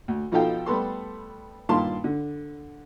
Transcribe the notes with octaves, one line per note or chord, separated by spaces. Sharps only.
D2
B2 F3 D#4 A4 F5 G5
G3 A3 B3 A4 C6
G2 A#2 D#3 F5 A5 C6
D3